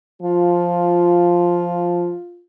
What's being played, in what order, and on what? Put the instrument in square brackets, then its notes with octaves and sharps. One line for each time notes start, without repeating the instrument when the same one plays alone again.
[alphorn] F3 [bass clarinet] F4